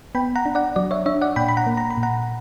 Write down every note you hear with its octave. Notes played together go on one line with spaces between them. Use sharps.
B3 G5 B5
F#5 A#5
D4
D5 F#5
F#3 D5
C#5 E5
D4 C#5 E5
D5 F#5
A#2 G5 B5
B5
F#5 A#5
A#3
A#5
B5
A#2
F#5 A#5